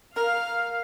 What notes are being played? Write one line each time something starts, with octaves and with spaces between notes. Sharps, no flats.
A#4 F5 F6